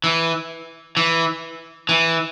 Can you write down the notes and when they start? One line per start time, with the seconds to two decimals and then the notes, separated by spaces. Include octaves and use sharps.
0.04 E3
0.97 E3
1.89 E3